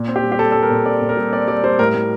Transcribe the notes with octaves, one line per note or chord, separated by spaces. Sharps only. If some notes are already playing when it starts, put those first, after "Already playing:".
Already playing: A#2
C4
G4
G3
G4
G3 A4
G3 A4
A#4
A#2
C4 D5
A#2
A#4
G3
C4 D5
G3 D5
G3 C5
A2 A#4
A2